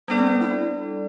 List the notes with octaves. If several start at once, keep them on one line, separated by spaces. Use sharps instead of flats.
G3 B3 D4 A4 D5
C4
B3
E4